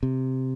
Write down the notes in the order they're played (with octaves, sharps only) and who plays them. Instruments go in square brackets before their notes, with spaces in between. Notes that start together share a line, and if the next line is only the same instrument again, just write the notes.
[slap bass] C3